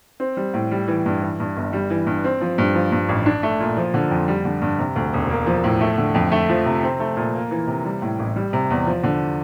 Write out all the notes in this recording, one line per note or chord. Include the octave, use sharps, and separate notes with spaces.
C4
G3
A2
G3
E3
G2
E3
G2
G1
G3
E3
G2
C4
F3
G2
F3
G2
A1
D4
A3
A#2
F3
D3
F2
G3
D3
G2
C3
D2
E1
A#3
F3
A2
A3
D3
F2
A3
F3
C3
C4
A3
A#2
A#3
E3
C3
G3
A2
A1
G3
C3
E2
F3
D3